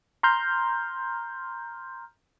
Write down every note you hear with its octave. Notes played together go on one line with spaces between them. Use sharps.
A#5 C6 F6 G6